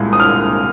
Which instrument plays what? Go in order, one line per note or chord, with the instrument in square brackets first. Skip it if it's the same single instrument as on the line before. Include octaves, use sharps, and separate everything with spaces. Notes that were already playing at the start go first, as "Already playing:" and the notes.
Already playing: [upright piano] C2 A#2 G#3
D#6
F6